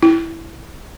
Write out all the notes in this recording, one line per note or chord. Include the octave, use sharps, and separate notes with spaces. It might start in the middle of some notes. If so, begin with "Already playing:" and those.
E4